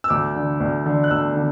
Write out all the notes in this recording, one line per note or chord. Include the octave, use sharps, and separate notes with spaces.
E6
D2 D6
D3
D2
D3
F#6
D2 E6
D3